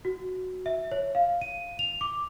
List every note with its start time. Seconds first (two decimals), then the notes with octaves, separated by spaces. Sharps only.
0.05 F#4
0.66 E5
0.92 C#5
1.15 F5
1.41 D#7
1.79 F7
2.01 D6